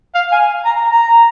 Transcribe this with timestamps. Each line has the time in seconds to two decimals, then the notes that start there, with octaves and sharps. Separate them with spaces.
0.15 F5
0.32 G#5
0.65 A#5
0.90 A#5